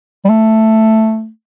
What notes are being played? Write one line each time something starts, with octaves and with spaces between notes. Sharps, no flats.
G3
A3